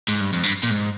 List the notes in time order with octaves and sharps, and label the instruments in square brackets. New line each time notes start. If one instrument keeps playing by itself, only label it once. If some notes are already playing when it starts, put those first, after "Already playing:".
[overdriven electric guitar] G#2
G2
F2
G2
A#2
G#2